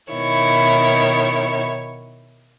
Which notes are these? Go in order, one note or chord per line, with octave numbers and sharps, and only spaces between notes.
B2 D#3 E4 C#5